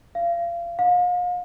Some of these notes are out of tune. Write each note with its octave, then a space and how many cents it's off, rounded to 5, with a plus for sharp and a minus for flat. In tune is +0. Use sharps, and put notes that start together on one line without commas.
F5 -30
F5 +40